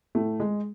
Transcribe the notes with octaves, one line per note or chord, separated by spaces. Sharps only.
A2 A3
G#3